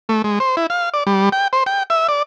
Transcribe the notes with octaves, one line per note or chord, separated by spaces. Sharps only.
A3
G#3
C5
E4
F5
D5
G3
G5
C5
G5
E5
D5